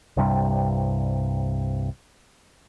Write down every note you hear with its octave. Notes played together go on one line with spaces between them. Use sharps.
C2 G2 C3 G3